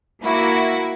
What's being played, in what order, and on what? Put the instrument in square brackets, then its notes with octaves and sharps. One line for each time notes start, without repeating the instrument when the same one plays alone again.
[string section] A#3 E4 F#4